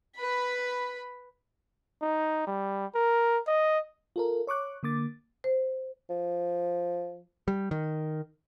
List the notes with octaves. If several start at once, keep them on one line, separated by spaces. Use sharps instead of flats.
B4 B5
D#4
G3
A#4
D#5
F4 A4 A#4
C#5 C#6 D6 F#6
D3 A#3 D6 A6
C5
F3
G3
D#3